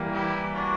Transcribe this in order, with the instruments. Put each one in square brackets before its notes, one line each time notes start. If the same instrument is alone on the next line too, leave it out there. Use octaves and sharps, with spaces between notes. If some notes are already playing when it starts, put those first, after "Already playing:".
Already playing: [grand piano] E3 G3 A#3
[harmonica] E4 G4
D4 F#4